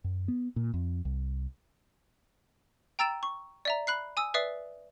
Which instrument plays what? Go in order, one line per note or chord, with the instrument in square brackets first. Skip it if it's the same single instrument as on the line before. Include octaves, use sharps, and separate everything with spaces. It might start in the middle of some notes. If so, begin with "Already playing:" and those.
[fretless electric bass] F#2
B3
A#2
F2
C2
[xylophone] G5 A#5 E6 A6 D7 E7
C#6
D5 E5 A#5
B5 F#6 C7
G#5 D#6 E6
B4 D5 E5 D#6 C7